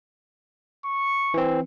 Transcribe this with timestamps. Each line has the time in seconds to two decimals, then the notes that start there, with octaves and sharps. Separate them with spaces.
0.85 C#6
1.34 E3 C4